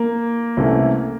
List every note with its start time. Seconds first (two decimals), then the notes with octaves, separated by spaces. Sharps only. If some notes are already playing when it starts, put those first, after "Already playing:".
Already playing: A#3
0.57 C2 C3 E3 A3 C#4